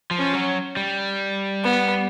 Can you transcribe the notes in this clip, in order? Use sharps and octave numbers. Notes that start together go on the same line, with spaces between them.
F3
C#4
F#3
G3
B3